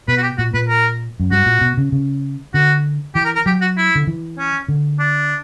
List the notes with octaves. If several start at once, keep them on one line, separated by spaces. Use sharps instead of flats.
B2 B4
F#4
G4
A#2 F#4
A#2 B4
A#4
F#2
G2 F#4
A#2
B2
C#3
C#3
D3 F#4
E3 G4
A#4
A#4
F#3 G4
F#4
E4
D3
E3
C#4
D3
D4